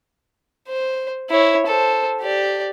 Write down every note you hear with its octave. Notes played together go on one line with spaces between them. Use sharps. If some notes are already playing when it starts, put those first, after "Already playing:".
C5
E4 C#5
A4 C5
G4 D5